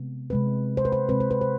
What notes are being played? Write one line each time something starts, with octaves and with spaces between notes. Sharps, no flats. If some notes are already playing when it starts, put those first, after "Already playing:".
Already playing: C3 G#3 B3
C3 G#3 C4 B4
C5
B4
C5
C3 G#3 C4 B4
C5
B4
C5